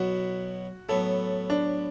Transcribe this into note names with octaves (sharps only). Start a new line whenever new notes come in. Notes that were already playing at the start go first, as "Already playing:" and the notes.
Already playing: B2 F#3 B3 E4 F#4
A2 F#3 B3 A4
D4